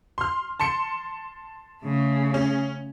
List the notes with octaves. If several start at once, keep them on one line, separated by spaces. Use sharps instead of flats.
C6 F6
A5 C6 C#7
C#3 A3
C#4